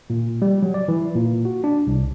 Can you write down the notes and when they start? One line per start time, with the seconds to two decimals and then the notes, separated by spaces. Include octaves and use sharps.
0.10 A#2
0.42 G3
0.63 F#3
0.74 D5
0.88 E3
1.15 A#2
1.45 F#4
1.64 D4
1.87 C2